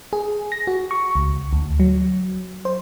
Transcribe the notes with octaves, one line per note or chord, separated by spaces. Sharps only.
G#4
A#6
F#4
C#6
C#2
D2
F#3
C5